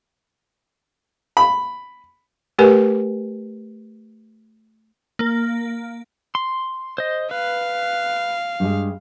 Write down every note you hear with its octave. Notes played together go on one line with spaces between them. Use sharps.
B5
A3 G4 A#4 B4 G#5
A#3
C6
C5 D#5
B4 F5
G2 G#3